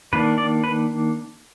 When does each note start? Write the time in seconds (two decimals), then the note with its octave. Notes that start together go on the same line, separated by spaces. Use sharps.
0.13 D#3 A#3 D4 B4
0.38 D5
0.64 B4